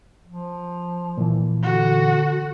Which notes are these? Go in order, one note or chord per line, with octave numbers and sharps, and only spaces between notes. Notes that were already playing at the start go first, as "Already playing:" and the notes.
F3
A#2 E3
D3 F#4